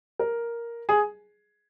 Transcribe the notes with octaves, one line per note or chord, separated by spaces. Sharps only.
A#4
G#4